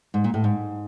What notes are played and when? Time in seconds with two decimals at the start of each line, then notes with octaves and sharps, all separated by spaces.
0.14 G#2
0.24 A#2
0.34 A2
0.44 G#2